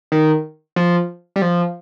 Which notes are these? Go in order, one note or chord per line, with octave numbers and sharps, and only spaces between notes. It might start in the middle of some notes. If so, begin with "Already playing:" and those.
D#3
F3
G3
F3